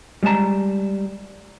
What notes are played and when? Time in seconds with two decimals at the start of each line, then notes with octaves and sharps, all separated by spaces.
0.23 G3 G#3 C#5 A5 A#5